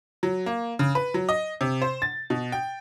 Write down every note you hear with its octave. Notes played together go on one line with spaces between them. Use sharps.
F#3
A#3
C#3
B4
F#3
D#5
C3
C5
A6
B2
G5